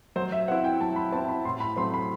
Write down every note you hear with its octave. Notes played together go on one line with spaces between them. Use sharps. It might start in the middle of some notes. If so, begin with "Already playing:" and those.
F#3 C5
E5
C4 E4 F#5
G5
F#3 A5
B5
C4 A5
E4
B5
A2 C6
B5
F#3 A3 C4 C6
B5